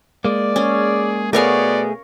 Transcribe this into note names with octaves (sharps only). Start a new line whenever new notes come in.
G#3 A#3 D5
C#4 G#4
B2 A3 B3 G#4 A#4 C#5 D5 F5